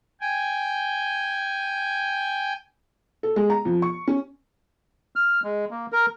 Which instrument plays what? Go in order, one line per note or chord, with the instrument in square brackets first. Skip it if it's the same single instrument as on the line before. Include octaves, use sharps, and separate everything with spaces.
[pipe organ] G5 G#5
[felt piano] A4
G#3
A#5
F2
C#6
C#4
[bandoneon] F6
G#3
A#3
A#4